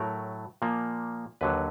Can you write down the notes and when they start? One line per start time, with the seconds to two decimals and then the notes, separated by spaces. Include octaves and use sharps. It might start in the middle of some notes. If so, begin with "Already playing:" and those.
Already playing: A2 F#3 A3 A#4
0.62 A#2 F3 A#3
1.41 D#2 D3 F#3 B4